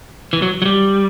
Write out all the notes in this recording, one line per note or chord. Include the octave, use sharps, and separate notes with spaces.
E3
F#3
F#3
G3